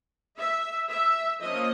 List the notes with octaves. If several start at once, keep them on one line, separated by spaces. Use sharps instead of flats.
E5
E5
F3 A#3 C#4 D#5